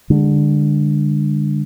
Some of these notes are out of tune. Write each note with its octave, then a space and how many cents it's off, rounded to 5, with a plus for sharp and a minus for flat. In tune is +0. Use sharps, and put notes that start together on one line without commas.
D3 +5 G#3 -35